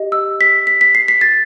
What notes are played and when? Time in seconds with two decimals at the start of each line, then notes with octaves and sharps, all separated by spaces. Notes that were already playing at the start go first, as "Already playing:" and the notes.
Already playing: G4 D#5
0.12 E6
0.41 B6
0.67 B6
0.81 B6
0.95 C7
1.08 B6
1.21 A6